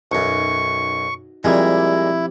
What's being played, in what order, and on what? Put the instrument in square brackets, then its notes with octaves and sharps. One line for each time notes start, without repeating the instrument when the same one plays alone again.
[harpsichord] B1 F#2 [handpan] D#4 F#4 [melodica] C#6
[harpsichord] A#2 G3 G#3 [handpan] F3 C4 G4 [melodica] E4